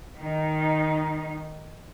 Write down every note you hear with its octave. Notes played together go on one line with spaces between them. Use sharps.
D#3 D#4